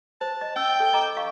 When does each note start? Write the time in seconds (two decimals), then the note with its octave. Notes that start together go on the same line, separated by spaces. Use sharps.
0.21 C5 A5
0.41 D#5
0.56 C#4 G5 E6
0.80 A4
0.93 D#5 A#5 D6
1.16 D#5 F5 C#6